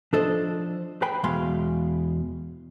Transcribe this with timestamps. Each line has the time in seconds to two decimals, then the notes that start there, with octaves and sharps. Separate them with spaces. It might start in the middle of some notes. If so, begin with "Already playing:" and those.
0.13 F3 D4 A4 C5 D#5
1.02 B4 C5 G5 G#5 B5
1.24 E2 B2 G#3 F5 C6